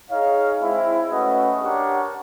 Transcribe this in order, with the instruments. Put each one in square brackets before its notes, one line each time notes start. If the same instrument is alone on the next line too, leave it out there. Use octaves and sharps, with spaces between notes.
[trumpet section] D#4 G#4 C#5 F5
G#3 C4 E4
A3 C#4 F#4 B4 D#5
D4 G4 A#4 C#5 F#5